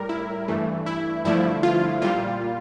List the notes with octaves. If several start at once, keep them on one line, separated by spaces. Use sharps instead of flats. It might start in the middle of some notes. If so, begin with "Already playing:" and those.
Already playing: A2 G3 A#4
E4
G2 E3 A3
E4
G2 D3 F3 A3 E4
F4
A#2 G3 F4